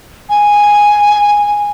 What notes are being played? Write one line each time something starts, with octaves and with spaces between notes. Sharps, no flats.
G#5